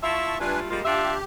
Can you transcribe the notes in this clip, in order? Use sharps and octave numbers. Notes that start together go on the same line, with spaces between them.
E4 F4 E5 A5 C#6
G3 A3 D4 F4 B4 G#5
G3 G#3 A#3 F4
D4 F4 G4 E5